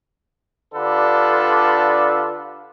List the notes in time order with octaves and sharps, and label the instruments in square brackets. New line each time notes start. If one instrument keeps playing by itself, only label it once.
[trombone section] D3 D4 F4 G4 A4 B4